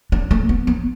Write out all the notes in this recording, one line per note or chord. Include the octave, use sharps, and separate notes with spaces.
D4
A3
B3
B3